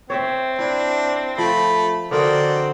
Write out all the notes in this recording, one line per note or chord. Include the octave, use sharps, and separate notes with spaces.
C4 C#5 E5 G5
D4 E4
F3 A3 B5
D3 C4 F#4 A#4 D5 D#5